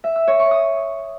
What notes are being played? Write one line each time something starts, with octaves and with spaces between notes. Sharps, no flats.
E5
E6
C#5
C#6
D#6